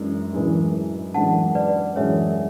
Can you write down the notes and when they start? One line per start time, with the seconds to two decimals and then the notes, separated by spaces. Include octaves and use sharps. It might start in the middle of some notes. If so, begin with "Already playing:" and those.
Already playing: F#2 E3 G#3 D4
0.33 F#2 E3 G#3 D4 G#4
1.14 F#2 E3 G#3 D4 G#4 F#5 A5
1.55 B4 D5
1.96 F#2 E3 G#3 D4 G#4 C#5 E5
2.29 E5